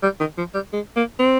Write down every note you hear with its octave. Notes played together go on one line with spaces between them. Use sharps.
G3
D#3
F3
G3
G#3
A#3
C4